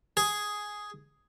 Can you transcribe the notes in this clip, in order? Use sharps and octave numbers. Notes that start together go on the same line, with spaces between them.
G#4